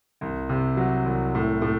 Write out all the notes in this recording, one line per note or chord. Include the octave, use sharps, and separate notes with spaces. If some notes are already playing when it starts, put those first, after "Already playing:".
C2
C3
F#3
C2
A2
A2